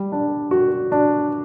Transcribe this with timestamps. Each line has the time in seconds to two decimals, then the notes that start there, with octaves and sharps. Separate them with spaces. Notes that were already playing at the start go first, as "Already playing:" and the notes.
Already playing: G3
0.12 D4
0.51 F#4
0.92 D4